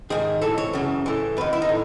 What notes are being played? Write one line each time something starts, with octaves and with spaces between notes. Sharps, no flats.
G#2 D#3 G#4
A2 E3 A4
C#5
F#2 C#3 E3
A2 E3
F#2 D#3 B4
E4
D#4
A2